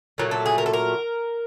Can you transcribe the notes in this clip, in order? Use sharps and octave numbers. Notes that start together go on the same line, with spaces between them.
A#2 F#3 A3
A4
G#4
A#4
A4
A#4